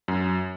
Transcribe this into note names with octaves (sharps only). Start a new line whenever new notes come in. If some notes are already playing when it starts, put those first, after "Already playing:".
F#2